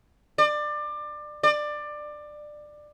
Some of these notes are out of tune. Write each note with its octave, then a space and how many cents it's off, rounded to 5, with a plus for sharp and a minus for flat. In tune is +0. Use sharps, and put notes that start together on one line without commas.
D5 +25
D5 +20